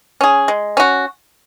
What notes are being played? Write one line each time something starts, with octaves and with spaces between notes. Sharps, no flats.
C#4 G#4
G#3
C#4 F#4